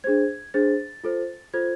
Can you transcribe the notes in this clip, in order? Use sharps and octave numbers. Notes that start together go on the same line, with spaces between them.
D4 G#4 C5 G#6
D4 G#4 C5 A6
F4 A4 C5
F4 A4 C5 G#6